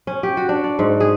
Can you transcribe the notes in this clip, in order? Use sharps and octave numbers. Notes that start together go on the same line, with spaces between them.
C#4
G4
F#4
D4
D5
G#2
G#4